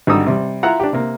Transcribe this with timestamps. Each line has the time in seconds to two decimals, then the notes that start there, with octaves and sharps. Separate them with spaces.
0.07 G#1 D3 G3 D#4 D#6 E6
0.27 C3 G3
0.63 E4 F4 E5 F#5 A#5
0.80 D4 G4
0.93 C3 A#3